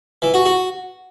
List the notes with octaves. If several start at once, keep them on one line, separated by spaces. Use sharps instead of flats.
E3
F#4
F#4